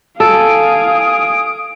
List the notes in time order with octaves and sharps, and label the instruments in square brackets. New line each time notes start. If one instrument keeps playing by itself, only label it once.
[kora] A4 [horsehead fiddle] F5 G#5 [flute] D#6 [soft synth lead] D7